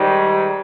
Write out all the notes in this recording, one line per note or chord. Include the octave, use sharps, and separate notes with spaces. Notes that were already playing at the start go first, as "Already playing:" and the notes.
Already playing: G#2 D#3 G3